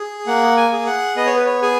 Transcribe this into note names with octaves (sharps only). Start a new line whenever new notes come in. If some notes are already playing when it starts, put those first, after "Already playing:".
Already playing: G#4
A#3 F#5
G#5
G#4
F#5
B3 D#5
C#5
B4
C#5
G#4 G#5